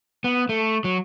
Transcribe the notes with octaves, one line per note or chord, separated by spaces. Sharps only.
B3
A3
F#3